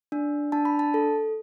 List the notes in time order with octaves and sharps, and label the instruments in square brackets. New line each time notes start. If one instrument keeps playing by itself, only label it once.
[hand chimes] D4
D4 A5
B5
A5
A4